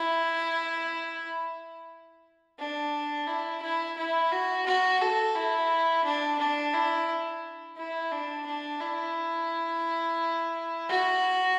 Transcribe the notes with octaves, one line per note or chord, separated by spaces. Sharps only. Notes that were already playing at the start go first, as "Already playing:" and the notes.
Already playing: E4
D4
E4
E4
E4
F#4
F#4
A4
E4
D4
D4
E4
E4
D4
D4
E4
F#4